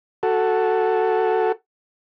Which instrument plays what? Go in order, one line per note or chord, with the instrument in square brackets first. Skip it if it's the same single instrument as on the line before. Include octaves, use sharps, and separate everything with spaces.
[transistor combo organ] F#4 A4